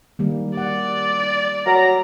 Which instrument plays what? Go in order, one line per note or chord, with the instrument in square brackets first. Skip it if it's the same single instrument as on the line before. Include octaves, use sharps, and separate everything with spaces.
[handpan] D#3 G3 A#3
[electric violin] D5 [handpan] F#5
[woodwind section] F#3 A#5